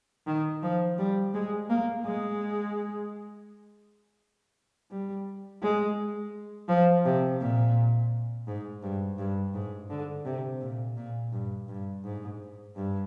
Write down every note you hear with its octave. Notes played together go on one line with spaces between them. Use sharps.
D#3
F3
G3
G#3
A#3
G#3
G3
G#3
F3
C3
A#2
G#2
G2
G2
G#2
D3
C3
A#2
A#2
G2
G2
G#2
G2